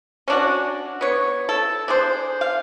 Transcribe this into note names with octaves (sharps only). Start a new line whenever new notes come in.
C#4 D4 F#4
B3 C#5
A4
D4 G#4 C5
F5